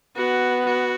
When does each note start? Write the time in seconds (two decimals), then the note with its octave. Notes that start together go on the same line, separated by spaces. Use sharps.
0.16 B3 F#4
0.65 F#4